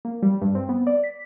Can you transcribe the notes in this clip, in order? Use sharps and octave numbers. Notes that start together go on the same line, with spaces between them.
A#3
G3
G2
C4
B3
D5
B6